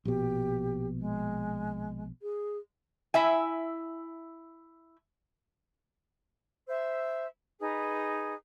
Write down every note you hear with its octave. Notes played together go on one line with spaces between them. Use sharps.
A#1 B2 G4
G#3
G#4
E4 E5 G#5
C5 E5 E6
D#4 G#4 B4